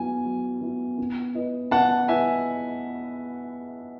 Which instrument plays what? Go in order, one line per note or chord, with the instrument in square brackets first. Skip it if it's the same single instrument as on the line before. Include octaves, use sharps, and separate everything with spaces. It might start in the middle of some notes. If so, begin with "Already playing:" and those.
Already playing: [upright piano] F#3 B3 E4 [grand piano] G#5
[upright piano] F#3
B3 E4
B3
E4 B4 D#5
[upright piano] B3 [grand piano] F#5 A5
[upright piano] E4 B4 [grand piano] E5 G#5